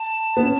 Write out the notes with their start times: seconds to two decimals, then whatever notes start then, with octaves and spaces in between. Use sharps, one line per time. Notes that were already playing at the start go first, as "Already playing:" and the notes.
Already playing: A5
0.37 B3
0.43 C#4